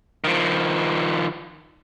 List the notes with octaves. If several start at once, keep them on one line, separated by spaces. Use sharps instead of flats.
D#3 F3